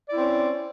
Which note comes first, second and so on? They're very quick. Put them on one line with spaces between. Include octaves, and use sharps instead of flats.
D5 E4 C4 C#4